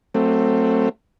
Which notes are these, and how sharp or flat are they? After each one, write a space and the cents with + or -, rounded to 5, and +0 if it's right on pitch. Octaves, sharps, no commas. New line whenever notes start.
F#3 +0 A3 +20 C4 +10